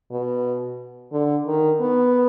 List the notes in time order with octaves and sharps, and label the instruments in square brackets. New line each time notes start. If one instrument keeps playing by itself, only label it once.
[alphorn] B2
D3
D#3
B3